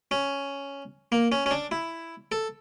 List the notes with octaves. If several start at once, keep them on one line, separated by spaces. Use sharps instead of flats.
C#4
A#3
C#4
C#4
D4
E4
A4